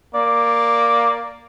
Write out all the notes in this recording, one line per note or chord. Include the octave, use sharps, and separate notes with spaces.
A#3 D5